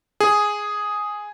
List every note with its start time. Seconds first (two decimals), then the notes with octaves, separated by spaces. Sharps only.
0.20 G#4